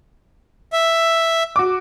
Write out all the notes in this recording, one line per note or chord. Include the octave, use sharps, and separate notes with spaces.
E5
F#4 D6